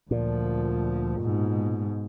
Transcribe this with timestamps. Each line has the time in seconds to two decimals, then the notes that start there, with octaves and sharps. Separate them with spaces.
0.11 D2 A#2 F3
1.21 G#2 B2